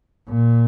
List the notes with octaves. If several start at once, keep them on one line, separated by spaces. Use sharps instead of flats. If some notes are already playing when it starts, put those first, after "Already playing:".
A#2